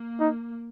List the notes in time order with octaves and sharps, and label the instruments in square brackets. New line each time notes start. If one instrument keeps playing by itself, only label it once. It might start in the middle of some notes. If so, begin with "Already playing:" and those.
Already playing: [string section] A#3
[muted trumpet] D#4